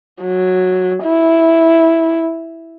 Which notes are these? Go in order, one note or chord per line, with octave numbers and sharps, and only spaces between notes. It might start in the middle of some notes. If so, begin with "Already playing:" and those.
F#3
E4